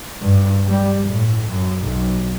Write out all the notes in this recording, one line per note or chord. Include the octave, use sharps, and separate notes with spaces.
G2
G3
A2
F#2
B1